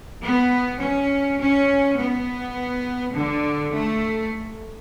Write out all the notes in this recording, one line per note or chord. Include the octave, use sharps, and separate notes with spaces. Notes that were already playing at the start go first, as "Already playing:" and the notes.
B3
C#4
C#4
B3
D3
A3